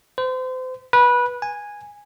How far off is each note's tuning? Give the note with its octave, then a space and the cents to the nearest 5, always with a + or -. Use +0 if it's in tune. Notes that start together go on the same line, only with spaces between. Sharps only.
C5 -35
B4 -20
G#5 -10